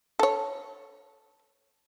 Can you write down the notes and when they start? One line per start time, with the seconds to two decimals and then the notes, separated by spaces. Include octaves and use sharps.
0.19 A4 C#5